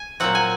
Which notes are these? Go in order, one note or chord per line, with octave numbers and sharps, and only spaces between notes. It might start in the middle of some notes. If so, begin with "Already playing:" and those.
Already playing: G#5
A#2 F#3 C4 F#5
G#5